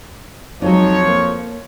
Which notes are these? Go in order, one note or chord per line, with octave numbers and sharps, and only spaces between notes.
F2 F3 F#3 G#3 D#4 C#5
A#3